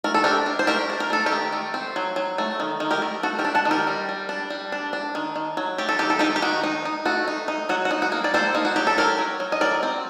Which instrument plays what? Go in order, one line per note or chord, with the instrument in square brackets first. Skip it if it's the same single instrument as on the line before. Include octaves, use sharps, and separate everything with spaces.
[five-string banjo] A3 A#4
A4
D4 G4 A#4
D4
C5
A3 G4 A#4
D4
A#4
A3 A4
G4 A#4
D#3
A3
C4
F#3
F#3
A3
D#3
D#3
G4 A#4
A3
A3 F#4 A4
G4 A#4
D4
F#5 A5
D#3
G4 A#4
G3
G3
D4
G3
D4
D4
D#3
D#3
F#3
A3 G4
A4
D#3 G4
A4
D#3 D#4 G4
G4
D#3 F#4
D#4
D#4
A3 F#4
D#4
D#4
F#3 F#4
F#4
D#4
F#4
A#3
D5
A#3 A4 C5
A#3 D#4
F#4
F#3 G4
A4
F#3 G4 A#4
F#3
F#3
D#5
F#3 A#4 D5
C4